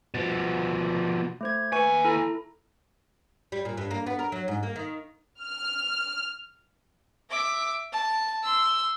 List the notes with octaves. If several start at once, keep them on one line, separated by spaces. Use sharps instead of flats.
B2 F3 A6
A3 C5 G#6
D#2 B4 E5 G#5 C#6
E4 A4 A#5
G3
A#2
G2
A#3
B3
A#4
F#3
G#2
A#3
D#3
F6
E5 D6
A5
C6 E6